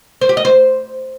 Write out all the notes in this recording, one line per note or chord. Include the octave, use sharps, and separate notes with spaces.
C5
G4
D#5
C5